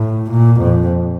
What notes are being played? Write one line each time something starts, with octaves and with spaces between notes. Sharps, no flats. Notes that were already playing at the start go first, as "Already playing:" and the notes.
Already playing: A2
A#2
F2